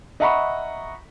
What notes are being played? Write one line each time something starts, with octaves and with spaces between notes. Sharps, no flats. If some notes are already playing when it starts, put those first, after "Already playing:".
D#5 E5 F#5 A#5 B5 C#6